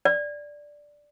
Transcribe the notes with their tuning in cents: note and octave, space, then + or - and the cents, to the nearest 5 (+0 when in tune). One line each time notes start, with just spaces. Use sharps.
D5 +0